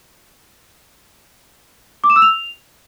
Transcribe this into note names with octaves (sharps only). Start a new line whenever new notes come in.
D6
E7
E6
F7